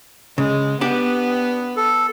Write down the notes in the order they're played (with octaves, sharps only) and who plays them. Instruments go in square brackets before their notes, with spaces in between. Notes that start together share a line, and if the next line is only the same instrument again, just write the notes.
[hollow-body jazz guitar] C#3 [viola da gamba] G#3
[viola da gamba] B3 [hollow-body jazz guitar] D4 G4
[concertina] A4